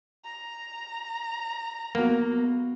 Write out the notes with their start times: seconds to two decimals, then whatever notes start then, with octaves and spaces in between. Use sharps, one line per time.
0.24 A#5
1.95 A#3 B3 F#4